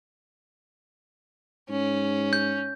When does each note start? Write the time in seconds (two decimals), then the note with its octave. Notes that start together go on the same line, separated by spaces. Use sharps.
1.69 G#2 C#4
2.33 G6